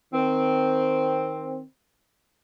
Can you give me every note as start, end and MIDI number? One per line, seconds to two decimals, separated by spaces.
0.12 1.61 51
0.12 1.61 60